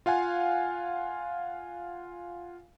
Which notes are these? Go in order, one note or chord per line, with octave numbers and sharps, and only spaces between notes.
F4 F5 F#5 G#5